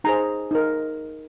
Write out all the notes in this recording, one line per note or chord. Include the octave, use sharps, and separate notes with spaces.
D#4 G#4 C5 A#5
D#4 A#4